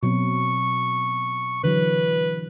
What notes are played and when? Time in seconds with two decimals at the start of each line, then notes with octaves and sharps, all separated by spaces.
0.03 B2 F#3 C4 C#6
1.64 D3 E3 F#3 B4